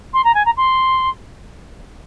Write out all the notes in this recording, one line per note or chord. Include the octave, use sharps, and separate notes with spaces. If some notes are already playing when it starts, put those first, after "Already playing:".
C6
A#5
G#5
A#5
C6